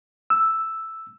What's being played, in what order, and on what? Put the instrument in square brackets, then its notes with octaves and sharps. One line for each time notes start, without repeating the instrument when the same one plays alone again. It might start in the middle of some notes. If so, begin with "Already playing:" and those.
[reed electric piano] E6